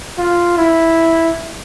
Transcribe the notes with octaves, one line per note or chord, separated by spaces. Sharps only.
F4
E4